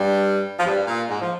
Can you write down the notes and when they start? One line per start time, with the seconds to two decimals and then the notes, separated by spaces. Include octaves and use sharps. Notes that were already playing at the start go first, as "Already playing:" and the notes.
Already playing: G2 G3
0.60 F3
0.66 G2 G3
0.87 A#2 A#3
1.09 G#2 G#3
1.21 F3